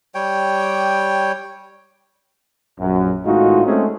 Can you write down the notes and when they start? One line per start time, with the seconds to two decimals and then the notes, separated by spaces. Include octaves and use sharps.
0.15 G3 C#5 G5
2.79 A#1 F#2
3.26 G#1 A2 G#3 D#4 F4 F#4
3.65 G#3 A3 C4 C#4 G#4